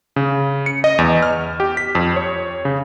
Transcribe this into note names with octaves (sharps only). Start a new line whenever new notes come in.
C#3
C#7
D#5
E2
F6
G4
B6
F2
C#5
C#3